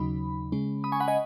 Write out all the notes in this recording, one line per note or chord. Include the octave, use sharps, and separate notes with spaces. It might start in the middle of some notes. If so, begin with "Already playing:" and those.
Already playing: D#2 C#3 F#3 D#4 B5
C#3 G#3 C#4
B5 D#6
G#5 C#6
F#5 B5
D#5 G#5